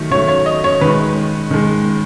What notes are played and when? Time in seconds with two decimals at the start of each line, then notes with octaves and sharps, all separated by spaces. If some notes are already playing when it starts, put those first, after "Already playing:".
Already playing: D#3 F#3 A3
0.11 D#3 F#3 A3 C#5
0.28 C#5
0.46 D#5
0.64 C#5
0.81 D#3 G#3 B4
1.51 D#3 G#3